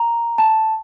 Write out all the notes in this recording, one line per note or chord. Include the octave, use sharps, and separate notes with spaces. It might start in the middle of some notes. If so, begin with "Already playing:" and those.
Already playing: A#5
A5